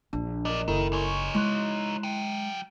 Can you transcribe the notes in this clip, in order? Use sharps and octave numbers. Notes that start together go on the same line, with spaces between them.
A#1 D4
F#3 A#4 D5 D#5
F#1 D#3 E4 A4 A#4
D#4 C#5 G#5 C6 C#6
G#3 E4 C6 F#6
F#3 G5